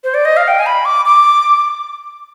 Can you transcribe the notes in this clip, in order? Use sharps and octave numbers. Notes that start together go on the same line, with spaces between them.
C5
D5
D#5
F5
G5
G#5
B5
D6
D6